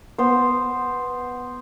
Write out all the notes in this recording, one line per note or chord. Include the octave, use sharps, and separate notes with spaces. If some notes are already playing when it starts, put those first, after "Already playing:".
B3 C5